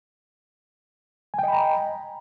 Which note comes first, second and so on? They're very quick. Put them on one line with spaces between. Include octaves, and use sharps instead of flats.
G#5 G5 D#5 B5 A#5